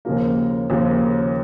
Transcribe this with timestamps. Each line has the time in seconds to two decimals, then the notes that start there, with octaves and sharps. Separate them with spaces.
0.05 D#2 C#3 F3 A#3
0.70 D#2 C#3 F3 A#3